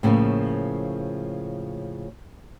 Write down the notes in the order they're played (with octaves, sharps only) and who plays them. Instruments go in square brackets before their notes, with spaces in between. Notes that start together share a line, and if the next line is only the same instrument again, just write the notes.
[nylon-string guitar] A2 C#3 F3 G3 A#3